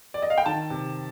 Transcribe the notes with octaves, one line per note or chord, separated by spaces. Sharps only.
D5
D#5
F5
G5
D#3 A5
C3